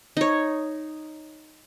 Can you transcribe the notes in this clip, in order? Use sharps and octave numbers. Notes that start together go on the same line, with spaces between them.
D#4 C#5